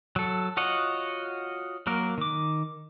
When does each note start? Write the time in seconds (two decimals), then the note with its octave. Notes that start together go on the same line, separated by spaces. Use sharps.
0.16 F#3 A4
0.57 F4 F#4 C#5 D#5 F#5
1.87 F#3 A#3 A#4
2.18 D#3 D6